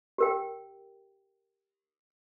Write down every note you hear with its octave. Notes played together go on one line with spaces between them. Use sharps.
G4 A#4 G5